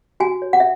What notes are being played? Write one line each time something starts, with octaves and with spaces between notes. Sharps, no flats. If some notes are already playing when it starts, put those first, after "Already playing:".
F#4 G#5
C#5
F#5
E5